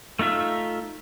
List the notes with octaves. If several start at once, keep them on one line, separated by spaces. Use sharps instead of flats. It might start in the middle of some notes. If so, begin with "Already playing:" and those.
A3 D#4 F4 E5